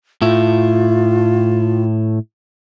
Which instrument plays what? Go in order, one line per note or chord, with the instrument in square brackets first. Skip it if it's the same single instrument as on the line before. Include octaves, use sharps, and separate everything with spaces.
[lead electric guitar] A2 E4 [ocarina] F4